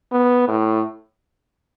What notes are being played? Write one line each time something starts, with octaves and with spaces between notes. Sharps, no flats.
B3
A2